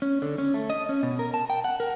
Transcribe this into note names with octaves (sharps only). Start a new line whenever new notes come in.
C#4
D3
C#4
A3
D#5
C#4
B2
A#4
A5
G5
F#5
A#4